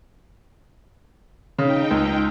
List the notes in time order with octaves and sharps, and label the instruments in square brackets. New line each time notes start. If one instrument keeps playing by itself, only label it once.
[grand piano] C#3 [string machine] D#4 G5
[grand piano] C#2